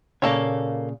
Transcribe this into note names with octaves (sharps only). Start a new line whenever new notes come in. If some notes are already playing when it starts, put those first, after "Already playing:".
A#2 C#3 A#3 A4 C#5